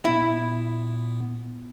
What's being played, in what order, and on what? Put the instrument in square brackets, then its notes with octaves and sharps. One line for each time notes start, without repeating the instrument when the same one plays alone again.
[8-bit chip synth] A#2 B3 [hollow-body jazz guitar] E4